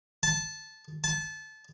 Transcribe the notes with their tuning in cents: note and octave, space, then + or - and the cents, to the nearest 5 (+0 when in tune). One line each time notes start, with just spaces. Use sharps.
A5 -15
A5 -25